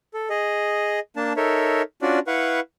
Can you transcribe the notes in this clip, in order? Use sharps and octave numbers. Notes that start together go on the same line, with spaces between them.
A4
G#4 D#5
A#3 D4 A5
D#4 A4 A#4 C#5 E5
C#4 D4 F4 F#4 D5
E4 B4 F5 F#5 C#6